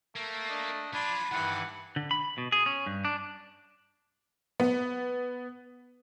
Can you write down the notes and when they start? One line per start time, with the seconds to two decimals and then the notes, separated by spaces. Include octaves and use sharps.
0.16 A3 A#3
0.49 D4 D#5
0.94 F3 D4 G#5 B5 C6
1.32 G2 D#3 E3 F#5
1.96 D3
2.11 B5
2.38 B2
2.52 G#4
2.66 C#4
2.86 G2
3.05 D4
4.60 B3